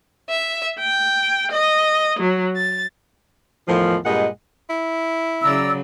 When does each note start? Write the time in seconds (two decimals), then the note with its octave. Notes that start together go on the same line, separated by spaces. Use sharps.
0.29 E5
0.79 G5
1.52 D#5
2.18 F#3
2.55 A6
3.67 E2 A2 D#3 F3
4.05 G2 A#2 G#3 D#5 F#5
4.70 E4
5.43 C#3 F#3 D5 A#5 E6